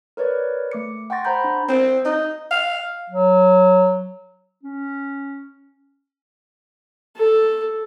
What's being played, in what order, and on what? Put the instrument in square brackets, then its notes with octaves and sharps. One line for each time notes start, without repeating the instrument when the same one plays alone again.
[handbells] A#4 B4 C#5 D5
A3 D6 C#7
F#5 G5 C6 C#6 A6 A#6
C5 F#5 A#5 B5 G6
D4
[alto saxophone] C4
D#4
F5
[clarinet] F#3
C#4
[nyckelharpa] A4